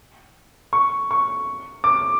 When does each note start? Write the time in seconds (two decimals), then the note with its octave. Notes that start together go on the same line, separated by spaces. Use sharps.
0.73 C#6
1.11 C#6
1.84 D6